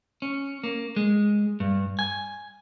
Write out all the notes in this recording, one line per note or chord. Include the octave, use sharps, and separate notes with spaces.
C#4
A#3
G#3
G2
G#5